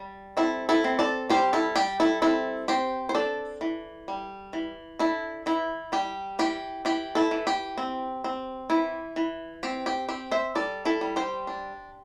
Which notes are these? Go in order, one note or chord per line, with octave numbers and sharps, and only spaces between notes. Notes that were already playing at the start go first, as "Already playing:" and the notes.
Already playing: G3
C4 E4 A4
E4 A4
C4
A4 D5
G3 G4 C5
E4 A4
G3 G4
E4 A4
C4 E4 A4
C4 G4 C5
C5
D4 A4 D5
E3
G3
E3
D4 E4 A4
E3 E4
G3 G4
E3 G4
E3 G4
E4 A4
E3
G4
C4
C4
E3 E4
E3
C4 G4
G4
C4 G4
C5 E5
G3 A4 D5
E4 A4
G3
G4 C5
D4